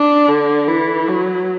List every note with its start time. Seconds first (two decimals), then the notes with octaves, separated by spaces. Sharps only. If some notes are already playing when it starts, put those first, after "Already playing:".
Already playing: D4
0.28 D3
0.68 E3
1.08 F#3